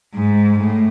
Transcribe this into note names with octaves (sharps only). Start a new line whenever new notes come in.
G#2
A2